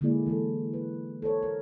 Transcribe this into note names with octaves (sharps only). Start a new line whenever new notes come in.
D3 G#3 A#3 E4 G#4 D5
E3 G#3 A4
B4
A4 C5 C#5
A#4